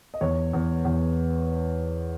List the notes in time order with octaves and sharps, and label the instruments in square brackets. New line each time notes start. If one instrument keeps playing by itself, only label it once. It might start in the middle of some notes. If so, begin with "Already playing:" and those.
[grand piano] D#5
E2 C#5
E2
E2